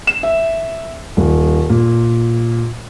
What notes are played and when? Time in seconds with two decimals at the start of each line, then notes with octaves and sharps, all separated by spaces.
0.07 E7
0.23 E5
1.17 D#1
1.70 A#2